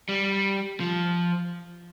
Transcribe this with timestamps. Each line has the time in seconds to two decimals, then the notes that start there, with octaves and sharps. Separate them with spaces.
0.09 G3
0.80 F3